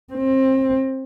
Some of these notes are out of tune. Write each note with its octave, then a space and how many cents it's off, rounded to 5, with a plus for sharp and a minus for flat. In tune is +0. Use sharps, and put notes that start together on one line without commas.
C4 +25